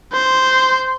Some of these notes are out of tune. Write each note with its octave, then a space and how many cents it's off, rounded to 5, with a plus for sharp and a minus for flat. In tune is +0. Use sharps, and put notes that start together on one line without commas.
C5 -5